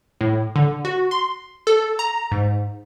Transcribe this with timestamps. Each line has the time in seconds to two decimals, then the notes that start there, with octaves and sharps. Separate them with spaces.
0.21 A2
0.56 D3
0.85 F#4
1.11 C6
1.67 A4
1.99 A#5
2.31 G#2